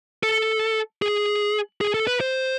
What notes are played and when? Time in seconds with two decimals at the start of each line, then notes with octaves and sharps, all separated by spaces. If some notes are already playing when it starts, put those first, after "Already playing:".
0.23 A4
1.02 G#4
1.81 G#4
1.94 A4
2.07 B4
2.21 C5